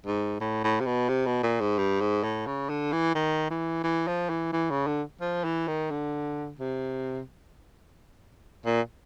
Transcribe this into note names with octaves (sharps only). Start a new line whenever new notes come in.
G#2
A2
A2
C3
B2
C3
B2
A#2
G#2
G2
G#2
A2
C#3
D3
E3
D#3
E3
E3
F3
E3
E3
C#3
D3
F3
E3
D#3
D3
C3
A#2